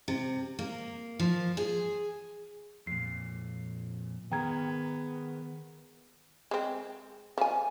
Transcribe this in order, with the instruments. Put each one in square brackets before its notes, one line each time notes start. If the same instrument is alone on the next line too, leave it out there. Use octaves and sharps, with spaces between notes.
[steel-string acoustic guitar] C3
A#3
F3
G#4
[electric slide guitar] F2 A#2 [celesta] C7
[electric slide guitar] D#3 G#4 A#4 [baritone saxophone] B3 [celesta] G5 A#5 G#6
[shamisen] G#3 C4
F3 G#5